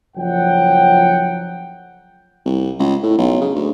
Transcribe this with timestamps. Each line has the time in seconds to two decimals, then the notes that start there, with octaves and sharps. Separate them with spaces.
0.17 F#1 F3 F#3 F#5 G5
2.45 C2
2.79 C#2
3.03 A2
3.18 B1
3.41 C#3
3.55 D2